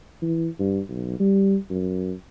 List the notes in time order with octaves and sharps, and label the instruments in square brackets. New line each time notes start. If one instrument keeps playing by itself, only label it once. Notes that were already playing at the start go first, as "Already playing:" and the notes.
[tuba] E3
G2
B1
G3
F#2